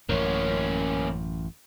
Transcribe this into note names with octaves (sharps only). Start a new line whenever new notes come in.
A1 F#2 A#3 C#4